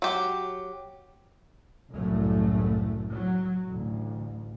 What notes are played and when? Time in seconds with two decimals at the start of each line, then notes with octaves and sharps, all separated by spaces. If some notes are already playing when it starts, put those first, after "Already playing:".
0.02 F#3 G4
1.93 F#1 C2 F#2 A2 F#3 A3
3.12 F#3
3.67 A1 D2